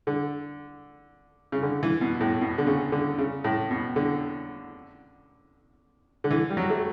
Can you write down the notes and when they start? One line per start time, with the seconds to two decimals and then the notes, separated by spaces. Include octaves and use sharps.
0.07 D3
1.52 C#3
1.63 D3
1.83 E3
2.01 B2
2.21 A2
2.41 B2
2.58 D3
2.67 C#3
2.92 D3
3.18 C#3
3.44 A2
3.71 B2
3.96 D3
6.24 D3
6.31 E3
6.50 G3
6.57 F#3
6.70 A3